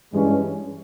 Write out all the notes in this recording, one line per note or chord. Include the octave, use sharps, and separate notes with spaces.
G2 E3 G#3 C#4